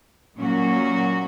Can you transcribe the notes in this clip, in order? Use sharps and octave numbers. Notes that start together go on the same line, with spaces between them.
A#2 F#3 A#3 C#4 F#4